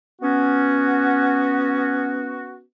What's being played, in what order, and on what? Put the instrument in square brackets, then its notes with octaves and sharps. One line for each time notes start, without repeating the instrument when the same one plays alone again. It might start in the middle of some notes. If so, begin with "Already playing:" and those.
[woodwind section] B3 C#4 F#4